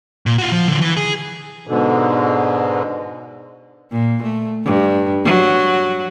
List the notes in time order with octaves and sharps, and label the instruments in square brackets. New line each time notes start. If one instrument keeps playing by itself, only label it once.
[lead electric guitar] A#2
F4 F#4
F3
D3 F3
E3
G#4
[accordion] G#2 B2 D3
[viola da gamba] A#2
A3
G2
F#3